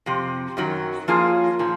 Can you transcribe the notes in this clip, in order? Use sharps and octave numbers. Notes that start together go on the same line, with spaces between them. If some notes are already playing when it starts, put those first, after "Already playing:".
F2 C3
F#2 D#3 F#3
F3 A#3 C#4 F4 G#4
A#2 F3